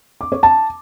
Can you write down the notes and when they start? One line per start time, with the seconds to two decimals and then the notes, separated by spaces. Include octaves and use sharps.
0.21 D6
0.32 C#5
0.43 A5